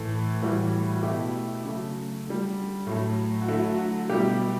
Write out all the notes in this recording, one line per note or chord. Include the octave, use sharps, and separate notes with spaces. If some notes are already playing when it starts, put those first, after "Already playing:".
Already playing: A2 E3 A3
A2 E3 G3 F#4
F#4
B2 A3 E4 G4
C#3 F#3 A3
D3 G3
A2 F#3 A3
F#4
D3 F#3 A3 E4
F#4
B2 G3 E4 G4